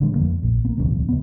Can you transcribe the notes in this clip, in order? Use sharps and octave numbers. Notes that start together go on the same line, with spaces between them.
A1 D3 G3 G#3
F2 A#3
A#1
A#3 B3
D1 B1 E2 C#3
C#3 B3